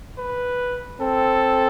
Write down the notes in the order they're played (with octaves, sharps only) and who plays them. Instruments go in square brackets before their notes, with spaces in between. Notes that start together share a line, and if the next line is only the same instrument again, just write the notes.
[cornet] B4
[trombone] C4 [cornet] A4